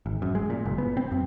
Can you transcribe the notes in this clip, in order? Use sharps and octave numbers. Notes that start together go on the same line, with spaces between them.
G#1
F#2
G#3
A#2
F#1
B3
C4
F#2